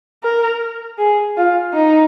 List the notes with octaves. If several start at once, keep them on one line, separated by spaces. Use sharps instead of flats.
A#4
G#4
F4
D#4